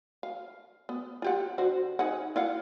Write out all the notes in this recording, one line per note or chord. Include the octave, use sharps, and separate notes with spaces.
F5
B3
F4 G4 F#5
D3 F#4 C5
D#4 G#4 F#5
E4 F5 F#5